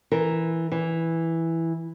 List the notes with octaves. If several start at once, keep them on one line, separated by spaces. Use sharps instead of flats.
E3 A#4
E3